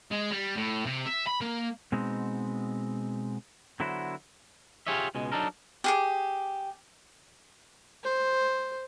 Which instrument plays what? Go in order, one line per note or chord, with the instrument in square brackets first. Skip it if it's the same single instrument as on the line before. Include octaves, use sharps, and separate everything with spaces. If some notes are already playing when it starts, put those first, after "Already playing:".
[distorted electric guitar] G#3
G3
A2
C3
E5
B5
A#3
[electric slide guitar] B2 G#3 B3 C4 D#4
D3 F#3 B3 E4 F#4 C5
[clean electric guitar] F4 G4 G#4 C#5 D#5 E5
C#2 B2 G#3
F#3 D4 D#4 A4 A#4
[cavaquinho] G4 G#4 D6
[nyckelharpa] C5